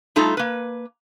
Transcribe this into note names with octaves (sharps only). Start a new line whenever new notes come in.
G3 A3 D#4 F4 A4
A#3 B4